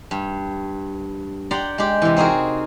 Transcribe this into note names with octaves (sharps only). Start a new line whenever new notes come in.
G2
G4 D5 F#5 A#5 C6
G#3 G4
C3 E3
C4 D#4 F#4 G#4 A#4